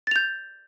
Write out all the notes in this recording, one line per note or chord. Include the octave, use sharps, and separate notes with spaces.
G6 A6 F7